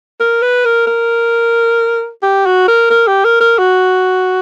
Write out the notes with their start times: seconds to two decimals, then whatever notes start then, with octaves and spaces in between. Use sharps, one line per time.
0.20 A#4
0.42 B4
0.65 A#4
0.87 A#4
2.23 G4
2.46 F#4
2.68 A#4
2.90 A#4
3.07 G4
3.25 A#4
3.41 A#4
3.58 F#4